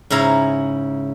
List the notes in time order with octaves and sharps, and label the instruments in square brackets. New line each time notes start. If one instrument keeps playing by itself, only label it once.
[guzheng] G#2 C#3 E4 A#5